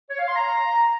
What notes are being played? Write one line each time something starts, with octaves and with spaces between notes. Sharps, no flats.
C#5
F5
C6
A#5